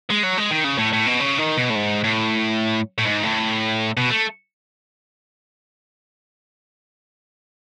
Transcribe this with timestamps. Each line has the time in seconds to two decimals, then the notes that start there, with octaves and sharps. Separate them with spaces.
0.10 G#3
0.24 F#3
0.38 G#3
0.51 D#3
0.65 C#3
0.78 A2
0.93 A2
1.07 B2
1.20 C#3
1.38 D#3
1.57 B2
1.70 A2
1.75 G#2
2.04 A2
2.98 A2
3.05 G#2
3.23 A2
3.97 B2
4.10 A3